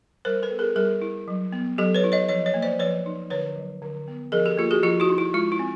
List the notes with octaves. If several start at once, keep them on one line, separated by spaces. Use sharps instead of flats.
G3 A#4 C5
A4 B4
B3
G#4 A#4
G3 G#4 A#4
E4
F#3
B3
F#3 G4 A4
B4 C#5
E4
C#5 D#5
F3 C#5 D#5
C#5 D#5
A#3
C5 D5
F3 B4 C#5
D#4
D3 B4 C#5
F#3
D3
B3
F3 G#4 A#4
G4 A4
A#3 F4 G4
F#4 G#4
F3 F4 G4
E4 F#4
D#4
E4
G#3 F4
E4
C4